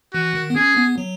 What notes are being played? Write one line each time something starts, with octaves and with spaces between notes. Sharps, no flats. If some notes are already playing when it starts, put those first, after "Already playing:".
E3 F#4
D#3
B3
C#4 G#4
B3
F#3